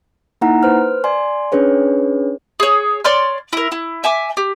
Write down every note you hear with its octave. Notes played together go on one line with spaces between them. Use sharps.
A#3 D#4 E4 F#5 A#5
B4 C5 F6
D5 G#5 C6
C#4 D4 G#4 B4 C#5
G#4 C#5
C#5 D5 C6 F6
E4 A#4
E4
E5 G#5 D6
G4